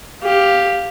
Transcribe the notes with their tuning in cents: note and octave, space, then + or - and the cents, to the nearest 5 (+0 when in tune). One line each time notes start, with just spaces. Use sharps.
G4 +5 F5 +0